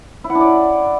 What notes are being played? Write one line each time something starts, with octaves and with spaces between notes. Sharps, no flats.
E4
F#5
D4
D5